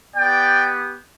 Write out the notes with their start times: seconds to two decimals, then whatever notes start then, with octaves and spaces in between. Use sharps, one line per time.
0.16 B3 G4 D5 G5